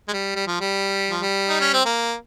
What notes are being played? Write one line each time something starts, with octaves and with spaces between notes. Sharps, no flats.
G#3
G3
G3
F3
G3
F3
G3
D#4
C#4
C4
A#3